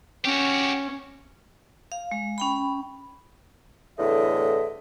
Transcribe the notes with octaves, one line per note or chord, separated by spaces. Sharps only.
C#4 F#4 G4
F5
G#3
C#4 G5 B5
E2 A2 D3 D#5 E5